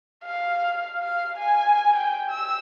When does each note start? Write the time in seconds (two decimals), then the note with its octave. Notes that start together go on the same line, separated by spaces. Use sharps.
0.24 F5
1.03 F5
1.37 G#5
1.96 G5
2.30 E6